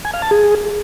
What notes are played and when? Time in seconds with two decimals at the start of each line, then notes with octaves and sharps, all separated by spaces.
0.05 G#5
0.13 F5
0.22 A5
0.31 G#4